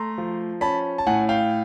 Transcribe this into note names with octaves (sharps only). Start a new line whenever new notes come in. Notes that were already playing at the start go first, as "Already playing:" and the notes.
Already playing: A3 A#5 C6
F3
C#4 A5 B5
A5
A2 F#5 G#5
F5 G5